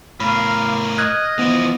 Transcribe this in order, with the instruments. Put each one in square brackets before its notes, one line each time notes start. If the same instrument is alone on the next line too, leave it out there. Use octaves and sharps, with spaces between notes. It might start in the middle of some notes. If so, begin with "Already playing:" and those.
[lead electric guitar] A2 A#4 [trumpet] F5 [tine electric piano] B5
[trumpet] D#5 [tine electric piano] F6 F#6 G#6
[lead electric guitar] E3 F3 [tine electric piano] B3